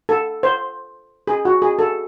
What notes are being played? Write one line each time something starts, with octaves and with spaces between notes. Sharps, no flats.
A4
C5
G#4
F#4
G#4
A4